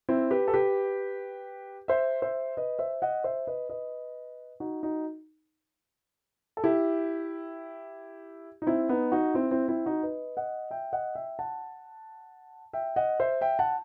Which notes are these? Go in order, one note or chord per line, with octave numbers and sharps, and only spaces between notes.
C4 E4
G4 B4
A4
G4 B4
C5 E5
C5 E5
B4 D#5
C5 E5
D#5 F#5
C5 E5
B4 D#5
B4 D#5
D#4 F#4
D#4 F#4
A4
E4 G4
D#4
C4 E4
B3 D#4
D#4 F#4
C4 E4
C4 E4
C4 E4
D#4 F#4
B4 D#5
D#5 F#5
E5 G5
D#5 F#5
E5 G5
F#5 A5
E5 G5
D#5 F#5
C5 E5
E5 G5
F#5 A5